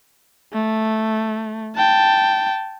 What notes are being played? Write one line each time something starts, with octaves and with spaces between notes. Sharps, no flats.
A3
G5 A5